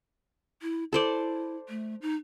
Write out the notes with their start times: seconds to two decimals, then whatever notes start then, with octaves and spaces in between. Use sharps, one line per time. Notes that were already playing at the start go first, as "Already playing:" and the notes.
0.62 E4
0.93 E4 A4 C5 D5
1.69 A3
2.02 D#4